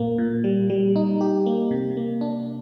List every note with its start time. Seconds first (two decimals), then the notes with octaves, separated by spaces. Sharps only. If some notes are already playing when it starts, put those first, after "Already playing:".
Already playing: A#2 A#3
0.18 A#2
0.44 G3
0.70 G3
0.96 D#4
1.21 G4
1.46 A#3
1.71 C3
1.97 A#3
2.21 D4